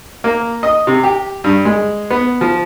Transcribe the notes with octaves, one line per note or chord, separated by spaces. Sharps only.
A#3
D#5
C3
G4
G2
G#3
B3
F3